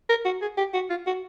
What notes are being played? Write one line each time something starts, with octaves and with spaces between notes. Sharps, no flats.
A#4
F#4
G#4
G4
F#4
F4
F#4